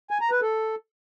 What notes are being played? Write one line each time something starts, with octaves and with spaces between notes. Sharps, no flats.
G#5
A#5
B4
A4